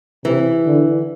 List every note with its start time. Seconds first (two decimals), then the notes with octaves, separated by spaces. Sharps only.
0.25 C3 E3
0.66 D3